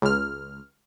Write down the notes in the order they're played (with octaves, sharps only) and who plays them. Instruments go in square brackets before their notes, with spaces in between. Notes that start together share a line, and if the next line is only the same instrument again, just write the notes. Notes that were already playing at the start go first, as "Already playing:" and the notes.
[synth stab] C#2 F6